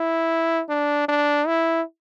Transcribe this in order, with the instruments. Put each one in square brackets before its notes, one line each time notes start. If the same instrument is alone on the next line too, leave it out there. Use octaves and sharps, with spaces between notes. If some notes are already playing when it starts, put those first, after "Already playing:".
Already playing: [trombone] E4
D4
D4
E4